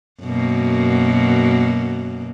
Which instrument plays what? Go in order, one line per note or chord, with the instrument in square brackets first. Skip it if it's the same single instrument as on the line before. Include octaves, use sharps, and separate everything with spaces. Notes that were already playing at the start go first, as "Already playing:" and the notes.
[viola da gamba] F#2 B2 A#3